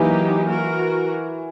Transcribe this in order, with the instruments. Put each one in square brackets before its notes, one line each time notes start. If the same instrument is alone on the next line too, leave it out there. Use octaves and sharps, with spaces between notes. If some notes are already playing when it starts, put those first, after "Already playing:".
Already playing: [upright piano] E3 [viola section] F#3 A#3 D#4 G4
[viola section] F#4 A#4